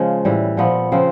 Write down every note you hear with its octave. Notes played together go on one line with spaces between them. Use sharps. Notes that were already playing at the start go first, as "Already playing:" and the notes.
Already playing: C#3 F3 G#3
A2 E3 G3
A#2 F3 B3
C#3 F3 C4